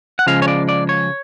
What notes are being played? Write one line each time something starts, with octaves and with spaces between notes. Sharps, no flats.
F#5
C#3 F3 G#3 F5
C#5
D5
D5
C#5